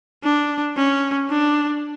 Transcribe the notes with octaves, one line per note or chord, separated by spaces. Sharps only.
D4
C#4
D4